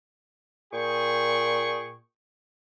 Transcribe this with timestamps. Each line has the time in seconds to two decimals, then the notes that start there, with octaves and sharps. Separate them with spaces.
0.73 A#2 G#4 G5 C#6